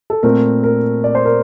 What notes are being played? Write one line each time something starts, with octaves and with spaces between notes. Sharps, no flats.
A4
A#2 A3 C4 A#4
A#4
D5
C5
A#4